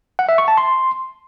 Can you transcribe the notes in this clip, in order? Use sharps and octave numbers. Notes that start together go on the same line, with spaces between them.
F#5
E5
C#6
A5
C6